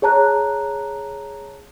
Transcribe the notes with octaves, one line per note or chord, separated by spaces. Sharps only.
G#4 C#5 A5 A#5 F#6